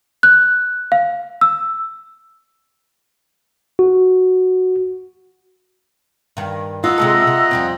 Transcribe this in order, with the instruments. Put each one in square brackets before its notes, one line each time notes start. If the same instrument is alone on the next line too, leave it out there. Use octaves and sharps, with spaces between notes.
[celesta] F#6
F5
E6
[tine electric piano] F#4
[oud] G2 D#3
[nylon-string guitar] F4 [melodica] D#5 F#5 A#5 [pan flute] E6
[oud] C3 G#3 A4
C3
F2 G3 C4